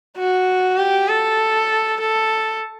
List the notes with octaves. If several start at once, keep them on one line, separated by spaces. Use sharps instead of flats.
F#4
G4
A4
A4